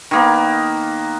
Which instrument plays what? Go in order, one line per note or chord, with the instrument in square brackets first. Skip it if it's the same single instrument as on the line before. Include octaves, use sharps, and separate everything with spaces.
[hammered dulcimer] D#3 A#3 B3